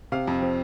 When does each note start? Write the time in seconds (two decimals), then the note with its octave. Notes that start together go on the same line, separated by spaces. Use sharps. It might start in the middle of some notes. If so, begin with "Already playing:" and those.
0.12 C3 F5
0.27 F2
0.42 F3